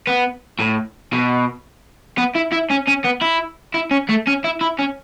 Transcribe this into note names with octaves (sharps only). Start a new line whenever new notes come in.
B3
A2
B2
B3
E4
E4
C#4
C#4
B3
E4
E4
C#4
A3
C#4
E4
E4
C#4